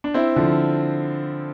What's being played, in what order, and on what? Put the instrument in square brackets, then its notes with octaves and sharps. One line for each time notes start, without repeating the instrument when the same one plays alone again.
[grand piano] D4
C4 E4
D3 F3